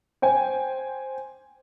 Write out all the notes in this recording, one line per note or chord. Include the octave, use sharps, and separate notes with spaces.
C5 G5 G#5